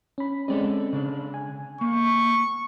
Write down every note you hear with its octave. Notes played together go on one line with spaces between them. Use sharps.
C#4 B5
G#3 C4 C#4 A4 D5 D#5
C#3 D4
G#5
A#3 C#6